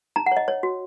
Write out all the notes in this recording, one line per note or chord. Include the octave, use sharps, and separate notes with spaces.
D#4 A#5
F#5
C#5 D#5
C#5
F#4